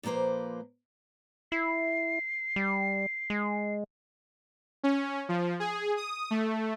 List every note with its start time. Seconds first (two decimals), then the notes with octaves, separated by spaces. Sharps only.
0.03 A#2 F3 A#3 B4 C5
1.52 E4 C7
2.56 G3
3.30 G#3
4.83 C#4
5.29 F3
5.60 G#4
5.97 D#6
6.31 A3